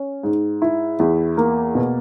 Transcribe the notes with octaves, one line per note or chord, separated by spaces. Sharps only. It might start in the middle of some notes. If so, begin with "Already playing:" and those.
Already playing: C#4
G#2
E4
E2
A#3
B2